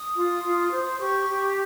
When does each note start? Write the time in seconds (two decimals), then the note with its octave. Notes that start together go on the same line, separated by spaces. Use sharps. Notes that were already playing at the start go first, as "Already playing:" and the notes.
Already playing: D#6
0.16 F4
0.43 F4
0.72 C5
1.00 G4 C#6
1.29 G4